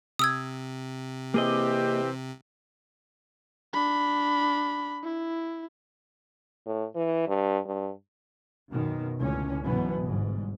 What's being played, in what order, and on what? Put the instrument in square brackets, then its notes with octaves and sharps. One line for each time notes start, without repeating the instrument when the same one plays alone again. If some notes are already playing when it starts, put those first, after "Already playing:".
[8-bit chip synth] C3 [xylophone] D#6 E6 G#6
[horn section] E3 C4 G4 [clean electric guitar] A#3 G#4 D#5
[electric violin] D4 B5
E4
[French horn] A2
E3
G2
G2
[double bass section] F#2 B2 D#3
C#2 A2 D3 C#4
G#2 B2 E3 F#3 B3
G1 G#2